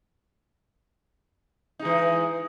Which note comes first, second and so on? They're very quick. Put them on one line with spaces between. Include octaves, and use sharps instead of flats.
D#4 G#3 E3